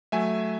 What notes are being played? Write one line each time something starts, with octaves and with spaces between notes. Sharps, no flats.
F#3 A3 E5 G#5